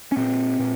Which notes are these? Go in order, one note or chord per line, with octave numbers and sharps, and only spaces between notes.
C#4
A#2 C4
A#2